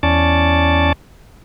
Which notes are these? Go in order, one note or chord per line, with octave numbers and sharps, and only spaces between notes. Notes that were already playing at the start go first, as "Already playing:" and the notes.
E2 C#4 D5 A5